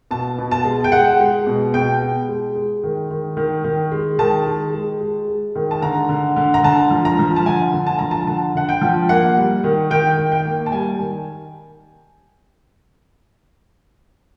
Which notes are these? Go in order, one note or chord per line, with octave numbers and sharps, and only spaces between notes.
B2 A5
B2
A5
G#3
G5
G#3 F#5
G#3
B2
B2 G5
G#3
G#3
G#3
D#3
D#3
D#3
D#3
G#3
D#3 A5
G#3
G#3
G#3
G#3
D#3
A5
D3 A#5
D3
D3
A#5
D3 A5
F3
A#5
F3
A5
D3 G#5
D3
A5
F3 A#5
A5
D3 A5
D3 F#5
G5
F3
A#3 F#5
G3
D#3
D#3 G5
D#3
G5
A#3
A5
G3 G#5
D#3